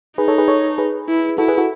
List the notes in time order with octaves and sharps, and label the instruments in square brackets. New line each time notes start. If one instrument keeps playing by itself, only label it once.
[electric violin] D#4 [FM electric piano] G#4 B4
[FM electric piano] A4 C#5
G#4 B4
A4 C#5
G#4 B4
[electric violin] E4
[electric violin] E4 [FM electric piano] F#4 A4
[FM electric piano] G#4 B4
F#4 A4